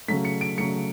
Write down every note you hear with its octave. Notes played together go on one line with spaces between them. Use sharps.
C#3 F#3 A3 B6
C#7
D7
C#3 F#3 A3 C#7